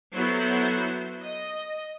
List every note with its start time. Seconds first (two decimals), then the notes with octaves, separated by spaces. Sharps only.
0.13 F#3 B3 E4 F#4 A4 C5
1.21 D#5